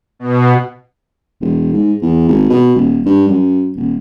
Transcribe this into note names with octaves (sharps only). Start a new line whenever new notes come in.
B2
E1
G#2
E2
G#1
B2
D#1
G2
F#2
D#1